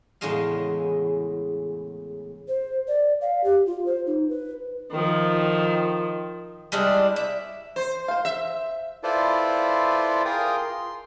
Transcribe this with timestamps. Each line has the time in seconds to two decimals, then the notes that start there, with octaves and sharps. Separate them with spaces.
0.21 E2 A2 C#3 G#3 D#5 F5
2.48 C5
2.88 D5
3.21 F5
3.44 G4
3.66 F4
3.86 C5
4.07 D#4
4.29 B4
4.91 D#3 F3
6.72 G3 G#3 D4 E4
7.16 E5
7.76 C5
8.08 C5 F5
8.25 E5
9.03 E4 F4 A4 B4 C5 D5
10.25 F4 G#4 A#4 G5 D#6
10.58 C6